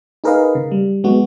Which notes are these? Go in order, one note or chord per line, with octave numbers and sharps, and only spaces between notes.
D#4 G#4 A#4 B4 D#5 F5
C#3
G3
F#3 G#3 B3 F#4